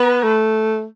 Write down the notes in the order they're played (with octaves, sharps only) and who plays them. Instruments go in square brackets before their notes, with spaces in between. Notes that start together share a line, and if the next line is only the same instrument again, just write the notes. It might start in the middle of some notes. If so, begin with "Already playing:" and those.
Already playing: [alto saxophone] B3 [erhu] B4
[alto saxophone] A3